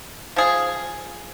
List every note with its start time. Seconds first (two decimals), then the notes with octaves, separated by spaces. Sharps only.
0.36 F3 G#4